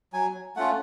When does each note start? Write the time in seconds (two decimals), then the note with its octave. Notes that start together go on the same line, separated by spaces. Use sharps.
0.13 F#3 G#5
0.56 A3 C#4 F4 F#5